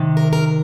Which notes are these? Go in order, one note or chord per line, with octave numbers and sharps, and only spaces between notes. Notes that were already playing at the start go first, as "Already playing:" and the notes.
Already playing: C3 D#3
A#4
A#4